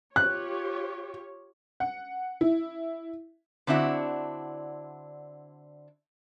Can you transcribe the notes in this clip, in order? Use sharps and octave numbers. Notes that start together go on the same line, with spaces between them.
F4 G4 C#5 F#6
F#5
E4
D3 C4 D4 E4 F#4